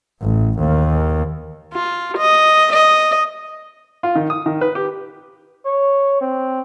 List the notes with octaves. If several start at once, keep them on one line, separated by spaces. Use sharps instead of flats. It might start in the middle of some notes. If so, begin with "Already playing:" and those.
A1
D#2
F4
D#5
D#5
F4
D#3
D#6
D#3
B4
G4
C#5
C4